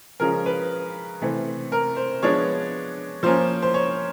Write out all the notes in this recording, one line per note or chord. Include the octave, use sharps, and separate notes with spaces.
C#3 F3 G#3 C#4 A#4
B4
C3 E3 A3 C4
A#4
C5
F3 G#3 B3 D4 C#5
F3 A#3 C#4 C5
C5
C#5